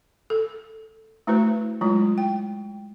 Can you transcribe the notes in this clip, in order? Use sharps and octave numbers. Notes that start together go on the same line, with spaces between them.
A4
A3 E4 F#4 B4 C5
F#3 G#3 E4 F4
G5